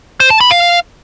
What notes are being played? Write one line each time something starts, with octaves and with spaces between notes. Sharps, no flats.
C5
A5
B5
F5